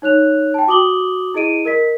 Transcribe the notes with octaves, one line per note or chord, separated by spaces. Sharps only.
D#4 C#5 F#6 F7
G5 A5
F#4 D6 D#6 F#7 G7
E4 G#4 D#5 D7 D#7
A#4 D#5 B6